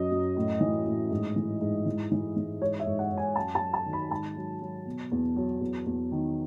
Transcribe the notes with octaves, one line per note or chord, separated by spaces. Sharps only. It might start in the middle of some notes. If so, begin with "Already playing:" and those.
Already playing: F#2 F#3 D#5
F#2
A2
E3
A2
G#2
E3
G#2
E3
E3
E3
G#2 C#5
E5
G#2
F#5
G#2
G#5
F#2 A5
A5
F#3
A5
D#3
B5
G#2 A5
F#3
F#3
B2
E2
F#3
E2
E2
D#3